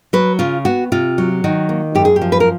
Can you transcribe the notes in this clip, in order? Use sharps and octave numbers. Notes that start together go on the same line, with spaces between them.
F#3 B4
C#3 F4
B3 F#4
C3 F4
F#3
D#3 F#4
A#3
F#2 G4
G#4
G4
F3
B4
A#4